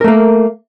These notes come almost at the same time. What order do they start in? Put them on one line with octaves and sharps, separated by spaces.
A#4 A3 A#3